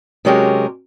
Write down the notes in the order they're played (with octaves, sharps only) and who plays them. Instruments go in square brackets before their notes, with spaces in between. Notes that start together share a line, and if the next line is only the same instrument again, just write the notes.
[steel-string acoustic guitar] C3 F#3 G#3 C#4 G4 A#4